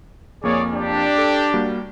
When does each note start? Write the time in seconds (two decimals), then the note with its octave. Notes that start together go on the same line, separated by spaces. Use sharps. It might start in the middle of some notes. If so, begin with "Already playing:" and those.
0.43 F2 A#3 G#4 C#5 D5
0.75 D4 G4
1.18 A4
1.54 G3 A#3 F#4